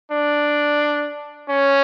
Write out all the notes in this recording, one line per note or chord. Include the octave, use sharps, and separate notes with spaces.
D4
C#4